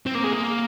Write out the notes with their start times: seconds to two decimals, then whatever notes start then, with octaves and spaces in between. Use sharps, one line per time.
0.06 C4
0.15 A#3
0.24 G#3
0.33 A#3